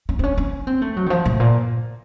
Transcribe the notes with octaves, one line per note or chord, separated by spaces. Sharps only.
C#4
C4
C#4
C#4
C4
A3
F#3
D#3
F3
A2
A#2